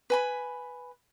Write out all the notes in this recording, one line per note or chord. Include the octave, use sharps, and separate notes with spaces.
B4 G#5 B5